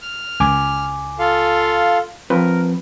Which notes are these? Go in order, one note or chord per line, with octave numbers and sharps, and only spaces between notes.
F6
C#2 G#5 D6
F4 A4 F5
F3 C4 A#4 B4